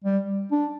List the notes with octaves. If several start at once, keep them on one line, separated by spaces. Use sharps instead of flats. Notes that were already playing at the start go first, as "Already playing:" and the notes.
G3
D4